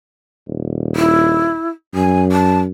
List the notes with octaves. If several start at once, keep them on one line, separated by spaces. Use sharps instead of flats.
D#1
E4
F#2 G#5
A5